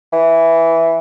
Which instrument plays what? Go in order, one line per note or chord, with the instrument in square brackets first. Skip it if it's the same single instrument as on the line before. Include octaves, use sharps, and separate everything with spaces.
[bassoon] E3